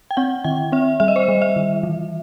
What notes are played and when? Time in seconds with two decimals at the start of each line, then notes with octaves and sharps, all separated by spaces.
0.11 G5
0.17 C4 F#5
0.44 D#3 G5
0.72 C4 E5
1.00 G3 E5
1.08 D#5
1.16 C5
1.23 D#5
1.28 G3
1.42 E5
1.56 D#3
1.83 E3